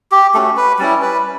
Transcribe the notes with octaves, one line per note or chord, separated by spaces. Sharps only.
G4
A3 C#4 F#4 A4
B4
G3 C#4 E4 D5
B4